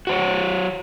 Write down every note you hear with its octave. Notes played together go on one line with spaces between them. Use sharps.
F#4 C5 C#5